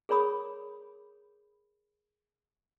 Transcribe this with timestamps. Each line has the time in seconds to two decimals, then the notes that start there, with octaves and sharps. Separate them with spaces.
0.09 G#4 A#4 C#5 B5 D#6